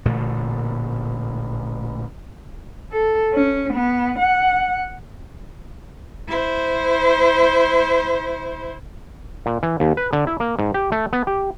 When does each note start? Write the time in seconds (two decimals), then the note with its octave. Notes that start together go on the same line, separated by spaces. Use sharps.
0.05 A1 A#2 D3 A3
2.91 A4
3.34 C#4
3.74 B3
4.19 F#5
6.28 E4 C5
9.46 A#2
9.63 E3
9.80 D#2
9.97 B4
10.13 D3
10.27 E4
10.40 A#3
10.59 G#2
10.74 G4
10.92 A3
11.13 B3
11.27 G4